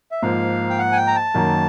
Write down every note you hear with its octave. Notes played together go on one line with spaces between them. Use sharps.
E5
G#2 F3 A#3 F5
G5
F#5
G#5
G5
A#5
A5
F#2 D#3 F#3 A#3